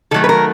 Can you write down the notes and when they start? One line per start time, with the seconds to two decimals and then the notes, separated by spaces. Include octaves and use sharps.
0.11 D#3 F#3 A3 A4
0.24 B4
0.29 A#4